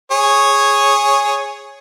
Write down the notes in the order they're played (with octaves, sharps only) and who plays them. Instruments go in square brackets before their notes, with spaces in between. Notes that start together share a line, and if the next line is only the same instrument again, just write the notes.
[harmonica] G#4 C#5